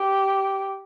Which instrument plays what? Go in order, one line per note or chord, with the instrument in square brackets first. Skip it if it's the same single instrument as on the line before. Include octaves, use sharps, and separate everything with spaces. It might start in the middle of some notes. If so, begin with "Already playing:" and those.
Already playing: [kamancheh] G4